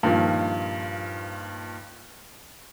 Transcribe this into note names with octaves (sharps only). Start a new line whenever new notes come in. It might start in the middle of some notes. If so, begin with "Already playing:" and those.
G2 A#2 D#3 F3